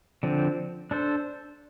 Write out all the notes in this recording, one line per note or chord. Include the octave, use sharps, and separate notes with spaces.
D3 F3 C4
D4 A4 C5